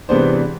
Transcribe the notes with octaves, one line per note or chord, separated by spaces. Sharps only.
C3 E3 G#3 B3 D4 C5